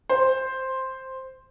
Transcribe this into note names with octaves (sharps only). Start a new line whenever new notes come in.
C5